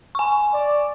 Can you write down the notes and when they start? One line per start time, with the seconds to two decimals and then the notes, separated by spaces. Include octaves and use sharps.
0.15 G#5 C#6
0.54 D5